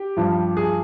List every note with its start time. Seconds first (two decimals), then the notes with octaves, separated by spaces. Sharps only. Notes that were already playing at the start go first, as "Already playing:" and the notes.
Already playing: G4
0.17 G2 F3
0.57 G#4